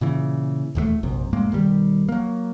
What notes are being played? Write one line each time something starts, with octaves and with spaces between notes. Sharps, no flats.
A#2 C#3 E3
D#1 E2 D#3 A3
A#1 F#2 C3
F#2 A2 G#3 A#3
B1 D#3 G3
F#3 A#3